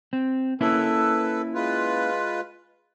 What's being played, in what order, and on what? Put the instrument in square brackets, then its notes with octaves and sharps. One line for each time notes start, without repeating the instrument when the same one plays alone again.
[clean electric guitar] C4
[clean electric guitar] A#3 C#4 E4 [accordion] A4 B4
[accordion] G#3 F4 B4